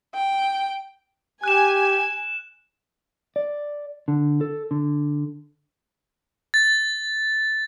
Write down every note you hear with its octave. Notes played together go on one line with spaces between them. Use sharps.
G5
G4 G#5 F#6 E7
D5
D3
A4
D3
A6